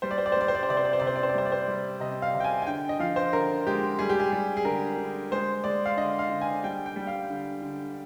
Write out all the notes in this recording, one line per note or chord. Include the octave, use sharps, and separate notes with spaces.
G3 C5
D5
C5
D5
C5
G3 D5
C5
D5
C5
C3 D5
C5
D5
C5
C3 D5
C5
D5
C5
D5
G3 C5
D5
C5
G3
C3 D#5
F5
C3
G5
G#5
G#5
D3 G5
D#5
F3 F5
C5
D3 A#4
G#3 G4
G3 G#4
G4
G#4
G3
G#4
D3 A#4
D3
G#3 C5
G#3 D5
F5
D3 D#5
F5
D3
G#5
G3 G5
G5
G3
F5
D3
D3